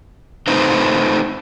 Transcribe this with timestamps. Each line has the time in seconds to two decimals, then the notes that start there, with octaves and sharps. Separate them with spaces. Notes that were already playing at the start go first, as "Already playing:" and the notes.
0.48 A3 C4 D#4 B4 C5